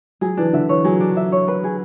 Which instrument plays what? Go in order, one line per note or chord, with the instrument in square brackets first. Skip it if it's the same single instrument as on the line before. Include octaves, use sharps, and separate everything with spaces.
[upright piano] F#3 [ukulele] G#4
[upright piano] E3 [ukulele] D4
[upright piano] D3 [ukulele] E5
[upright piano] E3 [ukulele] C#5
[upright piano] F#3 [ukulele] G#4
[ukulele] D4
E5
C#5
B4
G#4